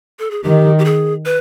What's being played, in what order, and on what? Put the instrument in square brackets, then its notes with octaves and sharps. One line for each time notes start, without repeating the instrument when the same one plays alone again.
[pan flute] A4
G#4
[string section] D#3 [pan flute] G4
[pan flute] G4
G#4
B4